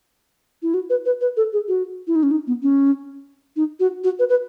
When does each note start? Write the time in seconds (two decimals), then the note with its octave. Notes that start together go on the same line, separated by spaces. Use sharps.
0.63 E4
0.74 F#4
0.90 B4
1.06 B4
1.21 B4
1.37 A4
1.53 G#4
1.68 F#4
2.07 E4
2.16 D#4
2.23 C#4
2.31 D#4
2.47 B3
2.62 C#4
3.56 D#4
3.80 F#4
4.04 F#4
4.19 B4
4.29 B4